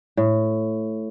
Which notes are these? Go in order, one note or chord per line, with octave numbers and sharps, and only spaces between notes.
A2